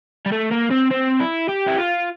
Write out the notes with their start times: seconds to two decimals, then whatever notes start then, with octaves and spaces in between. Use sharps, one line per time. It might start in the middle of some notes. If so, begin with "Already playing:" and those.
0.26 G3
0.32 A3
0.51 A#3
0.70 C4
0.91 C4
1.20 E4
1.49 G4
1.68 E4
1.78 F4